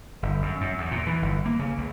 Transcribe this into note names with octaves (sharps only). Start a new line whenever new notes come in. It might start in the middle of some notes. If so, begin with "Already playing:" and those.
G1
F#2
F#2
E2
A#2
E3
G1
A#3
C#3
C#2